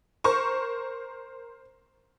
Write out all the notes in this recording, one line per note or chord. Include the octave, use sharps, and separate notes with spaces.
A#4 C5 C#6